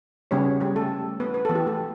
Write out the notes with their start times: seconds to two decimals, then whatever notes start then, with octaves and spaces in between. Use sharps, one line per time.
0.31 C#3 G3 B3 C#4 C#5
0.60 G3 G4
0.76 A3 A4
1.20 B3 B4
1.34 B4
1.45 E3 B3 A4
1.55 G4
1.66 A3 A4